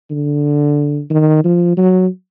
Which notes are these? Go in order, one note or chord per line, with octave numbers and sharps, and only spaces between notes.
D3
D#3
F3
F#3